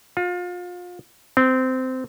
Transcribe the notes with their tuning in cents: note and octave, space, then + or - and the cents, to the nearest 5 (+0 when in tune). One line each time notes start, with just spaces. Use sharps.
F4 +30
C4 -20